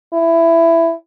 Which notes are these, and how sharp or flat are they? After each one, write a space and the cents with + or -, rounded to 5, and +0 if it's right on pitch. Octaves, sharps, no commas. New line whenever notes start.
E4 +10